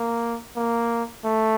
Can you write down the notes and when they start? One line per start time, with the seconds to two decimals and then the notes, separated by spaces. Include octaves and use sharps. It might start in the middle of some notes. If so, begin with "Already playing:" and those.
Already playing: A#3
0.56 A#3
1.25 A3